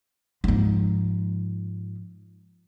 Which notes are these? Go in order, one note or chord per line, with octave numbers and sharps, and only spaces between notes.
G#2 F3